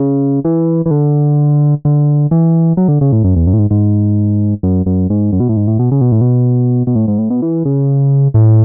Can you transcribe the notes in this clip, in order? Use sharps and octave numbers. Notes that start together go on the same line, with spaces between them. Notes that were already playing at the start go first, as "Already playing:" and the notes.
Already playing: C#3
E3
E3
D3
D3
E3
F#3
D3
C#3
A2
F#2
E2
F#2
A2
G#2
G#2
F#2
F#2
G#2
F#2
B2
A2
G#2
A2
B2
C#3
B2
A2
B2
B2
A2
G#2
A2
B2
E3
C#3
A2